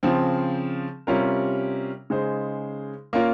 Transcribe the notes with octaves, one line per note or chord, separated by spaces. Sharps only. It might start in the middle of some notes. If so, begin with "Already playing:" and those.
C#3 F3 C4
C3 G3 C#4 F4 A#4
C#3 G#3 D#4 G#4 C5
A#3 C#4 F4 A#4